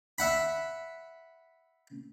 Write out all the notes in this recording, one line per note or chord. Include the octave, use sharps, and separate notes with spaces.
E5 F#5 B5